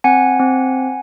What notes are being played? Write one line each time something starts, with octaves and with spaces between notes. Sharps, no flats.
C4 F#5 G#5
C4